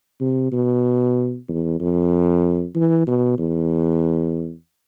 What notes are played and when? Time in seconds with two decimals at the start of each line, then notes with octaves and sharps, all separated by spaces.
0.20 C3
0.52 B2
1.48 E2
1.80 F2
2.75 E3
3.07 B2
3.38 E2